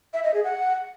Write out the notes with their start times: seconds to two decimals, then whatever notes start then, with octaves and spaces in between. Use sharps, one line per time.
0.14 E5
0.24 D#5
0.34 G#4
0.44 F#5